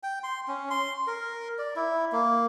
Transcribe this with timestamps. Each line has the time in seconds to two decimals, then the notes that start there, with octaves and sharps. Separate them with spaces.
0.03 G5
0.23 C6
0.48 C#4
0.70 C6
1.07 A#4
1.59 D5
1.76 E4
2.12 A#3